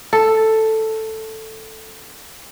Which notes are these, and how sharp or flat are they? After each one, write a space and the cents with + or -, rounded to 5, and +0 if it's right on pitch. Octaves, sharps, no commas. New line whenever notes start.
A4 +5